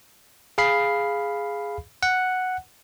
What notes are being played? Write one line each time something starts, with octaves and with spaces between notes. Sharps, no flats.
G#4 F5 B5 C7
F#5